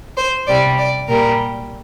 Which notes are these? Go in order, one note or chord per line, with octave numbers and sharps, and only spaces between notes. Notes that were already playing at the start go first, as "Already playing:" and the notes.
C5
C3 G3 D5
D5
A#2 G3 A#4